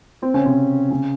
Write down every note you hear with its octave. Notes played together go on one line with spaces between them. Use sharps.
C4 C5
C#3 C#4
C3 C4
C#3 C#4